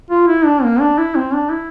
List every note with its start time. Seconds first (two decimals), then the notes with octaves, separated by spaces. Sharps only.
0.10 F4
0.27 E4
0.45 D4
0.64 A#3
0.80 D4
0.98 E4
1.15 C4
1.33 D4
1.51 E4